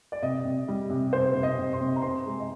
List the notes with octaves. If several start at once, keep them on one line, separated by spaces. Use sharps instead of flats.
D5
C3 D#5
C3
G3
C3
C3 C5
C3
D#5
C3
C6
C3
A#5
C4 C6
G#3
D#5